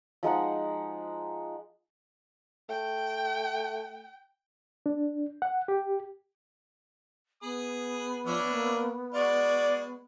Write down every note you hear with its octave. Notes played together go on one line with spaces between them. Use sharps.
F3 G#3 D#4 F#5
A3 G5
D4
F#5
G4
B3 G#4 B5 D#6
F3 C#4 D4 E4
A#3
G#3 F#4 D5